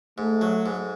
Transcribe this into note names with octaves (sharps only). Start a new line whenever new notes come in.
G#2 A3
F#3
G#2